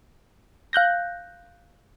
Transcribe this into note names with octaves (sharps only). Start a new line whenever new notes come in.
F5 F#6 G6 A#6